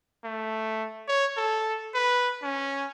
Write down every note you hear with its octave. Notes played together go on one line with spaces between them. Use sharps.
A3
C#5
A4
B4
C#4